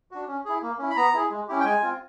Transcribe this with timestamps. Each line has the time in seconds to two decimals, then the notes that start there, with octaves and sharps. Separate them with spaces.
0.11 D4 F#4
0.28 C#4
0.45 E4 G#4
0.62 A#3
0.79 C#4 E4
0.90 B5
0.96 B3 A#5
1.14 E4 G#4
1.31 G#3
1.48 C#4 E4 G4
1.60 G5
1.65 G#3 G#5
1.82 C4 F4